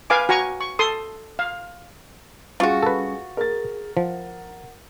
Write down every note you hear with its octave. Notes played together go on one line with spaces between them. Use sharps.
B4 F5 G#5 D6
F#4 G#5 A#5 C#6
C#6
A4 C6 D#6
F5
G3 C#4 F4 F#4 G#4 C#6 A6
A4 B4
G#4 A#4 A6
F3 F#5